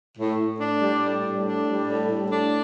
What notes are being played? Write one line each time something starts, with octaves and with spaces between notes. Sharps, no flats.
A2
A2
D4
G3
A2
A2
D4
G3
A2
A2
D4